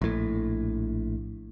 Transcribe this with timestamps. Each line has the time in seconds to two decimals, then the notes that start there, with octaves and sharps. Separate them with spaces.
0.02 A#1 A2